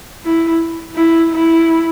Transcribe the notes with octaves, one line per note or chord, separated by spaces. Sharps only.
E4
E4
E4